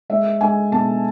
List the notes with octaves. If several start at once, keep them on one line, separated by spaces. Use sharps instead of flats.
G#3 E5
G#3 G#5
B2 A5